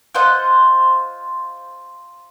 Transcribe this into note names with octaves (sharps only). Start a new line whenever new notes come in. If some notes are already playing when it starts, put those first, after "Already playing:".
F4 C5 D#5 F#5